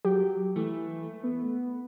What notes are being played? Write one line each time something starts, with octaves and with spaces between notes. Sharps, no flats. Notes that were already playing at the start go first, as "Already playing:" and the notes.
F#3 G4
E3 A3
B3